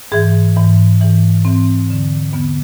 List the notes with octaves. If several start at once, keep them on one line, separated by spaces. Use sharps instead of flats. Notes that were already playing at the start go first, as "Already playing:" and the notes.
G#2 E3 G#4
G#2 E3
G#2 E3
G#2 E3 C4
E2 D3
E2 D3 B3